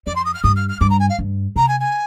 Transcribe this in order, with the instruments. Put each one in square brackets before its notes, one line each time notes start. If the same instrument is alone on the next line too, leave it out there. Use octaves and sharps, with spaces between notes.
[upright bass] F2 [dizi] D5
[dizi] C6
D#6
F6
[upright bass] G2 [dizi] D#6
[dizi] F6
F6
[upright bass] G2 [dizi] D6
[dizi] A#5
G#5
F5
[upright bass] G2
[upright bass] C3 [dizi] A#5
[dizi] G#5
G#5